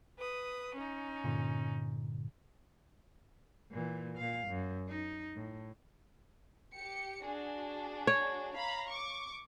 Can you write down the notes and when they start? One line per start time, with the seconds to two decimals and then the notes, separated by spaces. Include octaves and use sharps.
0.18 B4 D#6
0.77 C#4 D#4
1.24 G2 A#2 D3
3.71 A#2 E3
4.18 A#2 F5
4.48 F#2
4.89 D#4
5.36 A2
6.74 G4 C#7
7.25 D4 F#4 G#4
8.07 C#5
8.54 F5 A#5 B5
8.90 C#6 D6